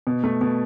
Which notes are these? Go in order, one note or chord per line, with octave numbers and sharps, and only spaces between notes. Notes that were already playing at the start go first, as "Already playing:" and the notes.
B2
A3
B2